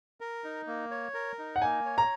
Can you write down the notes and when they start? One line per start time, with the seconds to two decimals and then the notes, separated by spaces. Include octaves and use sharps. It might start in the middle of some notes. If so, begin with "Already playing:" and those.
0.21 A#4
0.44 D#4
0.67 A#3
0.91 C#5
1.14 A#4
1.39 D#4
1.56 F#5
1.62 A#3 G#5
1.85 C#5
1.98 A#5